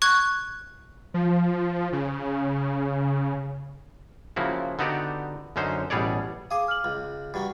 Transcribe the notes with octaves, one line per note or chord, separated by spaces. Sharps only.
C#6 F#6 G#6
F3
C#3
C#3 F3 A#3 E4 F#4
D3 B3 D#4 F#4 G4 D5
F#2 D3 C#4 D#4 C5
A1 B2 G3 G#4 C#5 D5
G#4 F5 D6 D#6
F6 F#7
C#2
G2 F#3